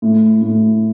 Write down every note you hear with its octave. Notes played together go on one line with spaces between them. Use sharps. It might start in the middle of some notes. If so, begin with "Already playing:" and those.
A2
A2